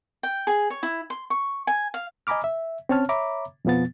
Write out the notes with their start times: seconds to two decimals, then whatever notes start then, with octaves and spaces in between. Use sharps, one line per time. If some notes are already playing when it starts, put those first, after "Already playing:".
0.23 G5
0.47 G#4
0.70 C#5
0.83 E4
1.10 C6
1.30 C#6
1.67 G#5
1.94 F5
2.27 D#5 G#5 A#5 B5 D6 F6
2.44 E5
2.89 C4 C#4 C#5 A5 F6
3.09 C#5 E5 A#5 B5 D6
3.65 F2 B2 F3 B3 A6